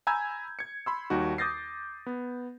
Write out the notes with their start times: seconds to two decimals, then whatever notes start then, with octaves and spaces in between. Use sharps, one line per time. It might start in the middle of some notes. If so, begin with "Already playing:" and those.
0.07 G#5 A#5 B5 E6 G6 G#6
0.59 G#6 C#7
0.86 B5 C6 E6
1.10 D#2 G3 D#4 F#4
1.38 D6 D#6 G6 A6 A#6 C7
2.06 B3